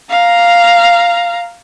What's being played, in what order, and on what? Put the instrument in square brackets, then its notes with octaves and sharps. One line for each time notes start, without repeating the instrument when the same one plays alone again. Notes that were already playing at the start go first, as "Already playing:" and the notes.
[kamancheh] F5 A#5